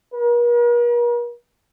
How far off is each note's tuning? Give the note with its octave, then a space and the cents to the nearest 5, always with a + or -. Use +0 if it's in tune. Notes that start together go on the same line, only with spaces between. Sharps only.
A#4 +45